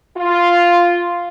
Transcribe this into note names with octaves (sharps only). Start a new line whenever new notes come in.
F4